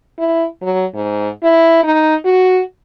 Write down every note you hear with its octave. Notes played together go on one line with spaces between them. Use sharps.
E4
F#3
G#2
E4
D#4
F#4